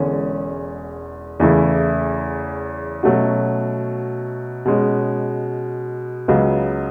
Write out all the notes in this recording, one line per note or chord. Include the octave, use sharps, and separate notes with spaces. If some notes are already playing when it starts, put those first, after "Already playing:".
Already playing: E1 E2 D3 G#3 C#4
E2 C#3 E3 A3 E4
B2 F#3 A3 C#4 F#4
B2 G#3 C#4
C#2 C#3 F#3 B3